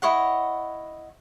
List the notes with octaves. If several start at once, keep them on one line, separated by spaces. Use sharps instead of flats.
E4 C#5 D#5 F#5